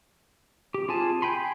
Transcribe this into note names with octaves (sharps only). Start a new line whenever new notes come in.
G4
C4 F4 G#4 G#5 A5
G5 G#5 B5 C6